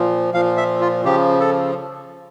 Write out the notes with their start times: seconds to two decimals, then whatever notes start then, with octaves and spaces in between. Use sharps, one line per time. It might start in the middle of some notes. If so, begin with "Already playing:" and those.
Already playing: A#2 F3
0.34 A#2 F3 F5
0.57 E5
0.81 F4
1.04 C#3 F3 G4
1.40 A4